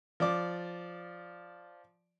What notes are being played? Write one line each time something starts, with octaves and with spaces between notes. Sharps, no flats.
F3 D5 D6